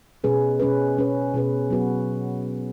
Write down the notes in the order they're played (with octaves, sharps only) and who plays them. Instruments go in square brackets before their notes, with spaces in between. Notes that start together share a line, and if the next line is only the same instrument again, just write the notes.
[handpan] B2 G#3 C#4 G#4 B4
B2 G#3 C#4 G#4 B4
B2 G#3 C#4 G#4 B4
B2 G#3 C#4 G#4 B4
F#3 B3 F#4 B4